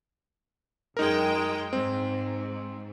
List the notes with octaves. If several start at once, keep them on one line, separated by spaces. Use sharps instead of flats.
F#2 G#3 D#4 A#4 G5
G#2 C4